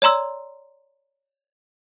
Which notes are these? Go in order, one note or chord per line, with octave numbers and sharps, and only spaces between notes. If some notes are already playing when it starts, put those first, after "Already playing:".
C#5 D5 A#5 C6 E6